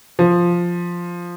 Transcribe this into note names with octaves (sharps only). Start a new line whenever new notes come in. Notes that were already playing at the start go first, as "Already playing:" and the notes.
F3